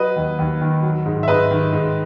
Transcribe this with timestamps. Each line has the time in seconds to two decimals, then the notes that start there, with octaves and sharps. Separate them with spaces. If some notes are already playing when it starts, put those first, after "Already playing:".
Already playing: F#3 B4 D#5
0.16 D#2
0.39 D#2
0.61 D#3
0.83 F#3
1.06 G#2
1.23 E5
1.28 G#2 B4 D#5
1.51 D#3
1.73 G#2